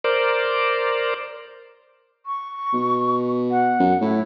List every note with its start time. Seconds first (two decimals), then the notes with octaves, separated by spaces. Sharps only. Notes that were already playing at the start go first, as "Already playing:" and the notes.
0.04 A#4 C5 D5
2.26 C#6
2.74 B2
3.51 F#5
3.80 F#2
4.01 A2 E4